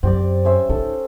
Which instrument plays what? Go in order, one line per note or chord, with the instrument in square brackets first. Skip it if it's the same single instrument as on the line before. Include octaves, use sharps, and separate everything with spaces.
[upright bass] F#2 [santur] C4 G4 D5
[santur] C#4 C5 E5
[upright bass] D#4 [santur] A4